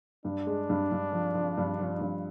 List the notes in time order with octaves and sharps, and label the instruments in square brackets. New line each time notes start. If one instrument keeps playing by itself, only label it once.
[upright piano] G2 [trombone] D4
[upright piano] G#3
G2
G2
F3
F3
G2
F3
G2